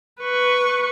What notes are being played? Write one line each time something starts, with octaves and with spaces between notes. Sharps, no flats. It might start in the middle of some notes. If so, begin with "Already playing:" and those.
B4 C#6